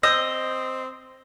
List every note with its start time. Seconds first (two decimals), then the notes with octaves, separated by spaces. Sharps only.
0.03 C4 D#5 E6 G6